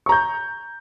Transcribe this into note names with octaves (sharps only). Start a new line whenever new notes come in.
A#5 C#6 G6